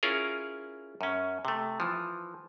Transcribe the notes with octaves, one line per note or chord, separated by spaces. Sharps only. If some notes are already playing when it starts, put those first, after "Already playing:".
C#4 E4 F4 G#4 A#4
F#2 C#4
C3 A3
E3 F3